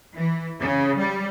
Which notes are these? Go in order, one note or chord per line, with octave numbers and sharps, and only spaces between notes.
E3
C#3
G3